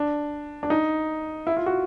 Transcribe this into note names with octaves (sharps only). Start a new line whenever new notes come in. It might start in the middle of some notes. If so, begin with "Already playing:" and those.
Already playing: D4
D4
D#4
E4
F4
F#4